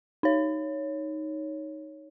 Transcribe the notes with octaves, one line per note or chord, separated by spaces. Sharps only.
D#4 C#5